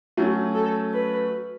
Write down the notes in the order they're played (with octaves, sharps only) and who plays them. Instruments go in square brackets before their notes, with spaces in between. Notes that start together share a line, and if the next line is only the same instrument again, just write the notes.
[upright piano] F#3 A3 C#4
[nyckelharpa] A4
B4